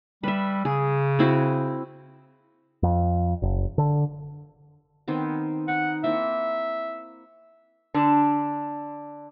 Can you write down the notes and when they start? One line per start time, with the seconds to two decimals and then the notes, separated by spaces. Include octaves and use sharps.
0.23 G3 B4 E5
0.65 C#3 G#4
1.19 C4 E4 F#4
2.83 F2
3.42 F#1
3.78 D3
5.08 D#3 B3 C4
5.68 D#4 F#5
6.04 A#3 C4 E4 E5
7.94 D3 D4